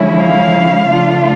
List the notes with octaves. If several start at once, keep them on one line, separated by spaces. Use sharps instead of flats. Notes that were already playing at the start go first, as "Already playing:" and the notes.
Already playing: D3 F3 G#3 C#4 E4
F5
C#3 F3 A3 D4 F4